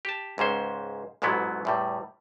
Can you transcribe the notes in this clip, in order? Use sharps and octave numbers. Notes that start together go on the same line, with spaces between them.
G4 A5
C#2 G#2 C#4 C5
A1 G#2 B2 F#3 B3 E4
E2 A2 G3